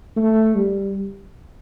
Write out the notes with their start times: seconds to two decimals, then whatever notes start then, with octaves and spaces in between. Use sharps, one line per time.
0.17 A3
0.55 G3